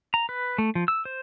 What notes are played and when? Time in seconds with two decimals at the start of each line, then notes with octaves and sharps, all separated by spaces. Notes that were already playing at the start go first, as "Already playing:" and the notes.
0.14 A#5
0.29 B4
0.58 A3
0.75 F3
0.88 E6
1.05 C5